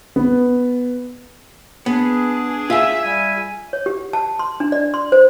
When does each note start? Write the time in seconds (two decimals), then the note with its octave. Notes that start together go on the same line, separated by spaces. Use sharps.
0.16 B3
1.86 B3 D4 G#4
2.70 F4 G#4 E5
3.03 G3 E5 G#5
3.73 C#5
3.86 G4
4.13 A5
4.39 C6
4.60 D4
4.72 D5
4.94 C6
5.12 C5